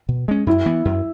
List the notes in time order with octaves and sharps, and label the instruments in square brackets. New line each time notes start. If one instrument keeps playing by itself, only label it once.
[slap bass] B2
G#3 C#4
[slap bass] F#2 [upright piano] E4
[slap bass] E3 B3
F#2